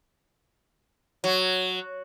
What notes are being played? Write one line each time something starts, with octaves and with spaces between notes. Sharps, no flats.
F#3